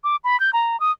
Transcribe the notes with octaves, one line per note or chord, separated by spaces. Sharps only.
D6
B5
G6
A#5
D#6